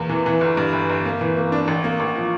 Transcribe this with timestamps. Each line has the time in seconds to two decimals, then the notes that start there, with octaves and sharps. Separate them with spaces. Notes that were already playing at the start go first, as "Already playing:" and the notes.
Already playing: E2 A#3
0.09 E3
0.26 E3
0.41 G1
0.57 G2
0.73 G1
0.90 G1
1.05 A#3
1.21 E3
1.37 A#3
1.52 D4
1.68 A1
1.84 A#3
2.00 A1
2.16 F3